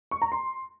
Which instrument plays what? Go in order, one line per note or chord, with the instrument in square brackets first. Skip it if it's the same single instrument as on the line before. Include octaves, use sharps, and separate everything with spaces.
[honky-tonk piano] C#6
A#5
C6